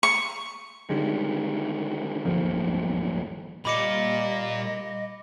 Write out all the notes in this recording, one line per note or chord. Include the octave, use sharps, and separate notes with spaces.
C#6
D3 D#3 G3 G#3
D1 G1 D#2 F3
A#2 G3 D#5 B5 D6 C#7